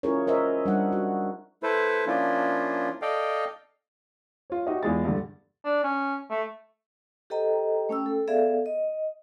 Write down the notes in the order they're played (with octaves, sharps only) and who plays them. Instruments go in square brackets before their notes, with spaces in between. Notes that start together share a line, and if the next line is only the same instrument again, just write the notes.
[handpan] C#4 E4 F4 G#4 A#4 C#5
A#4 C5 D#5 E5
G3 D4 F#5
F#4
[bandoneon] A3 E4 A4 B4 C5
F3 A#3 C#4 D4 E4 F4
A4 D5 D#5 F5 G5
[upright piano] F4 C#5
D#4 F#4 G4 D#5 E5
E2 E3 G#3 F4 G#4 A6
G2 D3
[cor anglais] D4
C#4
A3
[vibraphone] G4 A4 C5 D#5 G5 A#5
A3 C#4 G5 E6
A4
B3 G#4 A4 D5 E5 F5
D#5